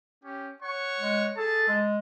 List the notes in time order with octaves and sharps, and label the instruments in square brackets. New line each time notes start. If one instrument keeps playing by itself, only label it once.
[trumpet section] C#4 G4
C#5 F#5 C#6
[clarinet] G#3
[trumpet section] G#4 A5 [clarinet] A4
[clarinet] G#3